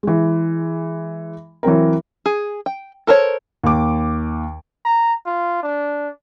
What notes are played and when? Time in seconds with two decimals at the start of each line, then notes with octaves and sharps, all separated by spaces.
0.03 E3 G#3
1.63 E3 F#3 C4 A#4
2.26 G#4
2.66 G5
3.07 A4 A#4 C5 C#5
3.63 D#2 D6
4.85 A#5
5.26 F4
5.63 D4